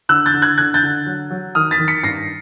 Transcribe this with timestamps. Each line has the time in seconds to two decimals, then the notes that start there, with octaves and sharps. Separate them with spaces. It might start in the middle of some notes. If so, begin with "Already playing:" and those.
0.09 D3 E6 F#6
0.26 G6 A6
0.34 D3
0.42 F#6 G#6
0.58 D3 F#6 G#6
0.74 G6 A6
0.83 D3
1.06 F#3
1.30 F#3
1.55 D#3 D#6 F6
1.71 A6 B6
1.79 D#3
1.88 B6 C#7
2.03 G2 A#6 C7